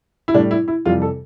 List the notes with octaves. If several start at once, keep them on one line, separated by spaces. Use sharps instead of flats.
E4
A2 G3 D4
E4
E4
F2 C3 E3 G3 F4
A4